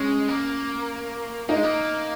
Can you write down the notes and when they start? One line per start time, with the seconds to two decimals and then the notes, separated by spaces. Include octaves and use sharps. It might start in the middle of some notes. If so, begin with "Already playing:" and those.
Already playing: G#3 C#4
0.28 A#3
1.49 A#3 D#4
1.56 G#3
1.63 A#3